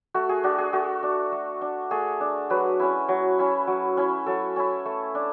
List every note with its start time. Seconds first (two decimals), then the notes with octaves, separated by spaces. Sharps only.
0.14 A3 F#4
0.29 G#4
0.44 D4 F#4
0.58 G#4
0.73 A3 F#4
1.03 D4
1.32 A3
1.61 D4
1.91 A3 G#4
2.20 D4
2.50 F#3 B4
2.80 C#4 E4
3.08 F#3
3.39 C#4 E4
3.67 F#3
3.97 C#4 E4
4.26 F#3 A4
4.56 C#4 E4
4.85 A3
5.15 D4